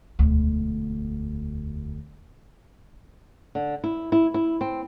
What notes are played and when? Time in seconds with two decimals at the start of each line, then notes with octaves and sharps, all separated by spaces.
0.19 E1 D2
3.55 D3
3.84 E4
4.12 E4
4.34 E4
4.61 C4